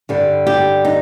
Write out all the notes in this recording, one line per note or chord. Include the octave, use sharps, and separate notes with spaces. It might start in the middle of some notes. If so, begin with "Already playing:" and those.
G2 D3 G3
G4
D#4